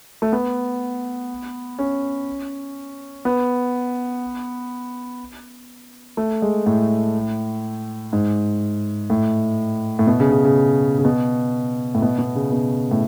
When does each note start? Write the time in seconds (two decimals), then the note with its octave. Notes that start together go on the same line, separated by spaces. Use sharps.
0.22 A3
0.33 B3
1.79 C#4
3.25 B3
6.17 A3
6.42 G#3
6.66 A2
8.13 G#2
9.10 A2
9.99 A2
10.07 B2
10.20 C#3
10.32 C#3
10.45 C#3
10.99 C#3
11.05 B2
11.95 A2
12.02 B2
12.19 B2
12.35 C#3
12.52 B2
12.91 A2